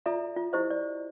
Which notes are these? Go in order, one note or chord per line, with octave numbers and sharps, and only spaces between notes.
F4 A4 D5 E5 A#5
F4
E4 G4 C5 D#5
D5